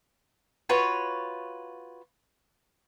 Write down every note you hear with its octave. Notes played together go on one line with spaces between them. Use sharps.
F4 F#4 B4 C#5